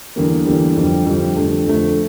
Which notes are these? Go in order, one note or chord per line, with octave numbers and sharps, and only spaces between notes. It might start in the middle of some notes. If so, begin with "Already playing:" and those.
E2 D3 G3 A#3
E2 D3 G3 A#3
F2 D3 G3
F2 D3 G3
F2 D3 A3
F2 D3 A3